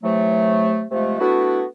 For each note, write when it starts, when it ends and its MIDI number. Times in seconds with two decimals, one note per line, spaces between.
0.03 0.84 48
0.03 0.84 52
0.03 0.84 54
0.03 0.84 57
0.91 1.17 48
0.91 1.17 53
0.91 1.17 56
0.91 1.17 57
1.20 1.64 57
1.20 1.64 59
1.20 1.64 62
1.20 1.64 64
1.20 1.64 66